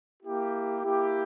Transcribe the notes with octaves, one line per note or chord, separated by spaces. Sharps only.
A#3 E4 G4
A#3 E4 G4